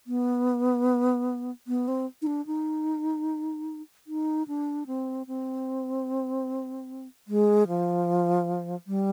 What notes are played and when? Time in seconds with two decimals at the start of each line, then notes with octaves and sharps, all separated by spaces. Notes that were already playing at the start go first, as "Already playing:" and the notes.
0.07 B3
1.67 B3
1.88 C4
2.22 D#4
2.27 D4
2.47 D#4
4.07 D#4
4.48 D4
4.87 C4
5.27 C4
7.28 G#3
7.68 F3
8.87 G3